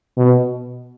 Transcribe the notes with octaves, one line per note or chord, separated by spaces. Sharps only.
B2